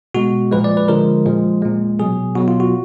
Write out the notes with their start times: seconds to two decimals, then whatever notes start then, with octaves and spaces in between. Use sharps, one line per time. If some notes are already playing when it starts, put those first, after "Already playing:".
0.15 B2 G#3 F#4
0.52 A#2 F3 G#3 B4
0.64 D5
0.77 B4
0.88 D3 F3 G#3 A#4
1.25 A#2 F3 G#3
1.62 A#2 G#3
1.99 B2 F#3 G#4
2.36 B2 F#3 F#4
2.48 F4
2.60 F#4